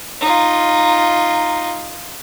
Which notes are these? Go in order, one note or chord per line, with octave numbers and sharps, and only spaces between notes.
D#4 F4